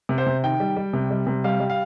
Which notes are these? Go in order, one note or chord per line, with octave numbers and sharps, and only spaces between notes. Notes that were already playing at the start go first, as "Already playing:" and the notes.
C3
C5
C3
D#3 G5
G3
G3
C3
G3
C3
G3 F5
G3
F5